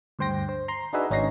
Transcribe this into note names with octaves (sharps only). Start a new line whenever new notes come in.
D2 G2 C5 G5 A#6
C5
A#5 C6
D4 D#4 F#4 G#4 B4 E5
G#1 C#4 D#4 C#5 A#6 C7